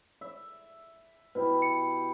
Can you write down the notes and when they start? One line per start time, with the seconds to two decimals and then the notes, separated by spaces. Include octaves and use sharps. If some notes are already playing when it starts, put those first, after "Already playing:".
0.21 E5
1.35 B2 E4 G4 B4
1.62 C#7